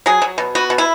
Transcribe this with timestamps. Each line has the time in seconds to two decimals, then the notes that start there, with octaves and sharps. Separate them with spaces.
0.06 F#3 G#4
0.22 F#3
0.38 B2
0.55 B3 F#4
0.70 B2
0.78 E4